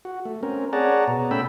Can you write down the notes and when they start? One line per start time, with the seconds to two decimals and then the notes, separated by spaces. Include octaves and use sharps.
0.05 F#4
0.25 A3
0.43 C4 C#4 A#4
0.73 G#4 C#5 D5 F#5 A5 A#5
1.08 B2
1.31 A3 C#4 G5 B5 E6